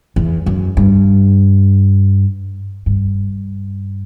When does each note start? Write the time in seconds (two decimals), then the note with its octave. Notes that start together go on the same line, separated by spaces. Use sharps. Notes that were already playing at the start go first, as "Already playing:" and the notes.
0.16 E2
0.46 F#2
0.77 G2
2.86 G2